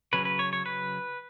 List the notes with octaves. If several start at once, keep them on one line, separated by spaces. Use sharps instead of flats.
C#3 F#3 C#4 B4
B4
C#5
C#5
B4